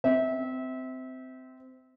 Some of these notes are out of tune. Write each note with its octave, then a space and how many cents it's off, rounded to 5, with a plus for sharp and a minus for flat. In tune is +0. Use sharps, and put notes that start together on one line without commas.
C4 -20 E5 -25